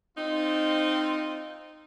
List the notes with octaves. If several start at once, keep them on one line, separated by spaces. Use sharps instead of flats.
C4 D#4 F4